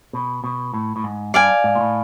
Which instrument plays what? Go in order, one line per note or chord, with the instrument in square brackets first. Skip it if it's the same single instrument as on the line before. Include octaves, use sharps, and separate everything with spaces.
[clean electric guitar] B2
B2
A2
A2
G#2
[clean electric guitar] G2 [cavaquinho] D5 F5 G#5
[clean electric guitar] G#2
A#2
A2